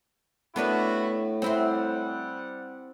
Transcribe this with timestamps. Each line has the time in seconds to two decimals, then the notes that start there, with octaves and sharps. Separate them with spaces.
0.56 A2 A3 B3 D4 E4 F#4 B4
1.42 G3 C4 E4 C5 F#5